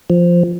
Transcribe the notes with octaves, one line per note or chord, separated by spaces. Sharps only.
F3